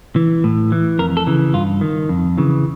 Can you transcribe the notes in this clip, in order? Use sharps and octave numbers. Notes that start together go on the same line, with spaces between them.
E3
A2
E3
F2 A#4
A4
C#3 E3
G2 F4
D#3
F2
C#3 E3